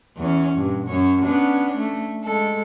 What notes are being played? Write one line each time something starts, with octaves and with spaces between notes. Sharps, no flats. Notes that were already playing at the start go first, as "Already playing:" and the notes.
E2 C#4
G2 A#2
F#2 C#4 C#5
B3 C#4 D4
A3
G#3 A4